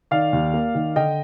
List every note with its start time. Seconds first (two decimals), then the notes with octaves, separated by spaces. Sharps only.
0.11 D#3 D5 F5
0.33 D#2
0.54 A#3
0.75 D#3
0.96 D3 D#5 G5